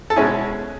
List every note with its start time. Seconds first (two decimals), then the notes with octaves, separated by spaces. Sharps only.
0.10 A4
0.16 B2 G#3 C#4 E4 G#4